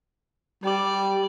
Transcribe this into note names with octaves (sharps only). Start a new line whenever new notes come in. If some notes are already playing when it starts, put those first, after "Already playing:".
G3 D5